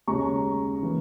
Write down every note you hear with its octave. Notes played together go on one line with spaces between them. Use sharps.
D#2 C#3 G#3 A#5 C#6
E3 A#3